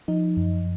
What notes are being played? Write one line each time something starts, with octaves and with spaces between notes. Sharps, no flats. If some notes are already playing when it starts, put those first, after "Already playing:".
F3 D#4
F#2